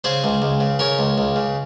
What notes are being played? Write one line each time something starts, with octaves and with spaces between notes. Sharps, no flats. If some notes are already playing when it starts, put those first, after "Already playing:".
C#3 G#4 C5
C#2
C#2
C#3
C#3 A#4 C#5
C#2
C#2
C#3